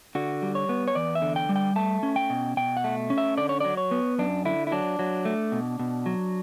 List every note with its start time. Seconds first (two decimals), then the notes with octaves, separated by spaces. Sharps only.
0.15 D3 F#4
0.42 G3
0.55 C#5
0.69 B3
0.88 C#5
0.95 E2 D5
1.15 E5
1.22 D3
1.36 G5
1.49 G3
1.56 G5
1.76 A3 A5
2.03 C#4
2.16 G5
2.30 B2
2.57 B2 G5
2.77 F#5
2.84 A3
3.10 C#4
3.18 E5
3.38 D3 D5
3.49 C#5
3.60 F#3 D5
3.77 C#5
3.91 B3
4.19 F#2 D4
4.45 D3 E4
4.67 E4
4.72 F#3 D4
4.99 F#3
5.25 A3
5.52 B2
5.79 B2
6.06 F#3